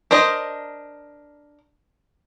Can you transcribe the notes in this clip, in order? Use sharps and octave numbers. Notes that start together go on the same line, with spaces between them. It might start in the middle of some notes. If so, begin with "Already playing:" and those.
D4 A#4 C5 D#5